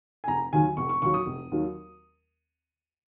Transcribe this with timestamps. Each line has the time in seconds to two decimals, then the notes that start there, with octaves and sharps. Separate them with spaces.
0.24 G#5
0.28 F1 A#5
0.52 D#2 D#3 F#3 G#5
0.77 F1 C#6
0.89 C#6
1.02 D#2 D#3 F#3 C#6
1.14 D#6
1.26 F1
1.51 D#2 D#3 F#3